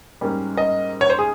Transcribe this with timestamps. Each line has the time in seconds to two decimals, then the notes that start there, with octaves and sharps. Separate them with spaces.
0.21 G#2 G3 A#3 C#4
0.57 D#5
1.01 C#5
1.10 C5
1.18 G#4